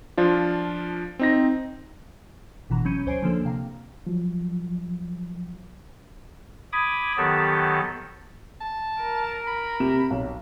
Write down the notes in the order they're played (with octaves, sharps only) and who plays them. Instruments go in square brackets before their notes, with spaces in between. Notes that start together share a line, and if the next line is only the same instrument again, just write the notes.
[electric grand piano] F3 D4 F4
C4 D#4 A#6
[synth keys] G1 B2 E3 A#5
F#3 C#4 B5 G6 C#7 D#7
D2 C5 C#5 G#5 C7 D7
D3 F3 A#3 D4 A4
C3 F5 A#5
[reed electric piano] F3 F#3
[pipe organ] B5 D6 D#6 G#6
D#3 F#3 B3 G4 A4 A5
[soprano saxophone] A5
[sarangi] A#4
[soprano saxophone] B5
[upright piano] C3 E7
B1